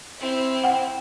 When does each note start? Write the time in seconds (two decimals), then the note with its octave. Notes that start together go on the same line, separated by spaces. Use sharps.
0.19 C4 E4
0.64 F#5 G5